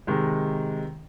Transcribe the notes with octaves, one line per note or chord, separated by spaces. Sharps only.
C3 D#3 G#3